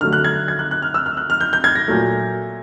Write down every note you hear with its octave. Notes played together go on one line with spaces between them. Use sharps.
D3 F#3 A3 F6
F#6
G#6
G#6
F#6
F#6
F6
E6
F6
F#6
F6
G6
G6
G#6
A#6
A#2 F#3 A3